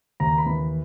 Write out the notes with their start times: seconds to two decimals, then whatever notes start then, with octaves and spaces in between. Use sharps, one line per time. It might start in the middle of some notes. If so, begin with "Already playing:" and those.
0.20 D#2 A#5
0.38 B5
0.46 E3